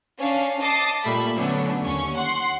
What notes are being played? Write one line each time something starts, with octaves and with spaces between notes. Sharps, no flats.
C#4 D4 F5
D#5 A5 D6 D#6 A6 C7
A#2 G3 A3 E5 B5
D3 F#3 A3 B3 C#4 D4
D#2 C#4 C#6
F#5 C6